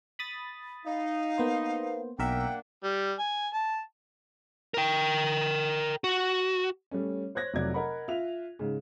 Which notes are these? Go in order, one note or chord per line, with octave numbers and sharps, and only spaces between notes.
B5 D#6 A6
D#4 F5
A#3 B3 C5
B1 A#3 D4 A#4 E5 F#5 G5
G3
G#5
A5
A#4 G5
F#4
G3 A3 C#4
C5 C#5 F#6 G#6 A#6
F1 C3 F#3 D5 G#6
A#4 D#5 F#5 B5
F4 E5 F7
G#2 C#3